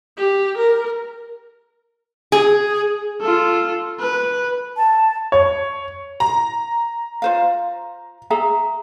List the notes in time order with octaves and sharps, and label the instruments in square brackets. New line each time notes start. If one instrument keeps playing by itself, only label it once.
[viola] G4
A#4
[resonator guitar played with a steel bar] G#4
[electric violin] F4 A4
B4
[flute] A5
[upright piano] C#5
[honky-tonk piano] A#5
[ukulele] F4 C5 F5
G#4 E5 A#5